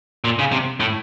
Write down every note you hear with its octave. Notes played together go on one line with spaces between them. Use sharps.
A#2
C#3
C3
A2